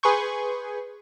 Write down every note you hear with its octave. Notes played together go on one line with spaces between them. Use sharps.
G#4 B4 G#5 C6 C#6 G6